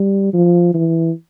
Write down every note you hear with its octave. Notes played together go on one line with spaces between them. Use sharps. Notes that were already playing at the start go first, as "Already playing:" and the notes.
Already playing: G3
F3
E3